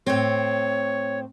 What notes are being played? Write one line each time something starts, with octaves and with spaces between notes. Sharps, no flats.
A2 C4 C#5